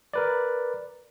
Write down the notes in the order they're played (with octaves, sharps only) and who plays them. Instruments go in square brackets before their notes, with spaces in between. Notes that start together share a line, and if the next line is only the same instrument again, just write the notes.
[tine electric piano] A#4 B4 D5